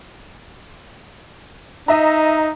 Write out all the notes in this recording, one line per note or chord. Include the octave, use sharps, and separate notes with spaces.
D#4 D#5 E5 A#5